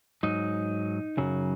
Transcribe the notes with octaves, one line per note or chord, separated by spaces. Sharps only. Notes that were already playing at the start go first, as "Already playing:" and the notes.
G#2 F#3 D#4
F#2 C#3 F#3